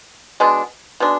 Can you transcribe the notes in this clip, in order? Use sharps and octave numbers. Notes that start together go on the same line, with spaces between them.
B2 G#3 D4
B2 G#3 D4